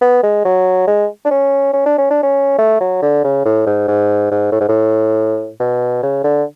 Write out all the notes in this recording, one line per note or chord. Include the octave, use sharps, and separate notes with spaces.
B3
G#3
F#3
G#3
D4
C#4
C#4
D4
C#4
D4
C#4
A3
F#3
D3
C#3
A2
G#2
G#2
G#2
A2
G#2
A2
B2
C#3
D3